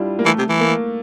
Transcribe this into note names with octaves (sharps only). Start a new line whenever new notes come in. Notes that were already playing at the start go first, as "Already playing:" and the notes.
Already playing: G3 D4 E4 F4
A#3
E3 A3
C3
E3
A#3